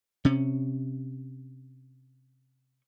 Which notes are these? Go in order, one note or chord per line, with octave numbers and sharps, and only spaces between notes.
C3 C#4